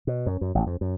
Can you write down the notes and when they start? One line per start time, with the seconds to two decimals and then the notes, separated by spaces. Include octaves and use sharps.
0.07 B2
0.26 F#2
0.41 F#2
0.55 A1
0.67 F2
0.81 F#2